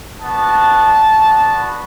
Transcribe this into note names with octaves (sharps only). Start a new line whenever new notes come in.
B3 D4 F#4 A5
B3 D4 F#4
B5